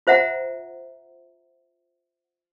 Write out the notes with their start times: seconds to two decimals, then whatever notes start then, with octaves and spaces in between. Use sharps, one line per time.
0.07 F4 C5 E5 F#5 A#5